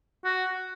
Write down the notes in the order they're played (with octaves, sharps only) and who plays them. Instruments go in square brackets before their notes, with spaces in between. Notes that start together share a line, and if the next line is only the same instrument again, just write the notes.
[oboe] F#4